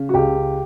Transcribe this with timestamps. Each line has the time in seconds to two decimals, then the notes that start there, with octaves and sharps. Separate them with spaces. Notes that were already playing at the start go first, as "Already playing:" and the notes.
Already playing: C#3
0.09 F#4
0.14 C#2 G4